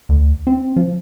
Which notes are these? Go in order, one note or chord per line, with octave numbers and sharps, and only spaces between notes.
D2
C4
F3